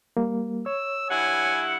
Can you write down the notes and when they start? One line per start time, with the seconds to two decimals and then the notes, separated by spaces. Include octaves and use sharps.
0.17 G3 A#3
0.66 C#5 E6
1.09 G2 E4 F#5 G#5